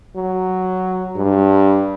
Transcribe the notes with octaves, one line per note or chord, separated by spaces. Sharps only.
F#3
G2